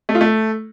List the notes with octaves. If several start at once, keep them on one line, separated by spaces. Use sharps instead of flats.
A3
F4
A3